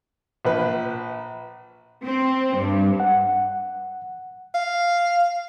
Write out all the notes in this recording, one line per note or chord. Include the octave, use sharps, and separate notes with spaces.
A#1 B4
C4
G2
F#5
F5